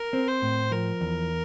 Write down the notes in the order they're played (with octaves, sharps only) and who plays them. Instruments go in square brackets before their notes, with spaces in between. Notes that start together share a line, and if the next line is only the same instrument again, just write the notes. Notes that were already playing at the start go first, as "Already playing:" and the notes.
Already playing: [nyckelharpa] A#4
[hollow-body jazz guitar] C4
[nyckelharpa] C5
[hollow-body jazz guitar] A2
[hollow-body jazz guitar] F3 [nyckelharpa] A#4
[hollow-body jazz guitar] E2